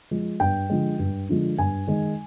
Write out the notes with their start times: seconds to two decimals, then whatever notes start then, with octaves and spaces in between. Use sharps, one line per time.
0.11 F3 G#3
0.40 G2 G5
0.70 D3 F3 G#3
0.99 G2
1.29 D3 F3 G#3
1.58 G2 G#5
1.87 D#3 G#3